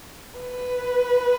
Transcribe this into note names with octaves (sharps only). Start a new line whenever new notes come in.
B4